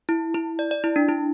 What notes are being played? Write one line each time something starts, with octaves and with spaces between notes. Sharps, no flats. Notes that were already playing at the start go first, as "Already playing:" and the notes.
E4
E4
D5
D5
E4
D4
E4